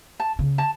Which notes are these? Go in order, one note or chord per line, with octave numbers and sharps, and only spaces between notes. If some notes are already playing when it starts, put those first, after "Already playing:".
A5
C#3
A5